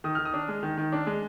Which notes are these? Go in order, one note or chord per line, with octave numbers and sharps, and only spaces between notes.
D#3 D#6
D#3 F6
D#6
D4
G#3
D#3
D#3
D4
G#3